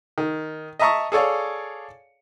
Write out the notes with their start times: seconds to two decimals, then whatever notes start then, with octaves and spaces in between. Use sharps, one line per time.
0.18 D#3
0.79 D#5 E5 A5 A#5 C#6 D#6
1.12 G#4 A4 C#5 D5 F5